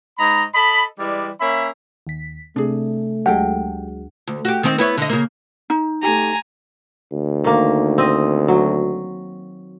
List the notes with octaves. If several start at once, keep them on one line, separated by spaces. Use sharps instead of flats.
G#2 D#5 A#5 B5
A4 D#5 B5
E3 G3 G#3 D5
A#3 C#4 E5 B5
D#2 B6
C3 A3 D4 G#4
D2 F#3 G#3 G4 A4 G5
D2
F#4 G4
D#3 C4 D#4
B3 E4 C#5
D3 D#5
C#3 A#3
D#4
A3 G4 G#5 A#5
D2
D#3 A#3
C4 D#5
F#3